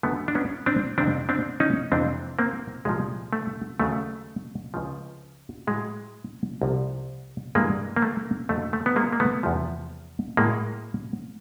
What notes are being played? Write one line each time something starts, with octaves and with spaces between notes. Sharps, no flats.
F#2 D3 F#3 A3 B3
D4
B3 C#4
C4 D4
F2 C3 D#3 C4 D4
C4 D4
C#4 D#4
F2 C3 E3 C4 D4
A#3 C4
C2 A#2 F3 G#3
A3
D#2 C#3 F#3 A3
C#2 C#3 F3
A2 F#3 G#3
C2 C3 F3
G2 E3 G3 G#3 A#3
A#3
A3
F2 D3 F#3 A3
A3
B3
G#3 A#3
A#3
A3 B3
E2 C3 F3
A2 F#3 G#3 A#3